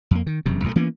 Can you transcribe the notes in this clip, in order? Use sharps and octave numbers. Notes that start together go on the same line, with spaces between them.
F2 A#3
D#3
E1 F#2 C3
B1 A#2 G3 A3
E3 A#3 B3 C#4